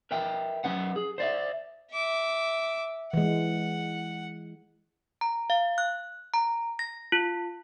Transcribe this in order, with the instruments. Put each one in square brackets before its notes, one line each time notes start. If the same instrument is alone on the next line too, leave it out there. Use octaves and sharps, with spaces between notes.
[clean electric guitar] A#4 B4 E5 G5
F#3 C#4 B4 F#5
G#4
C5 D5 E5
[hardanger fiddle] E5 D6
[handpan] E3 G#3 [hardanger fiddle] F#5
[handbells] A#5
F5
F#6
A#5
A#6
F4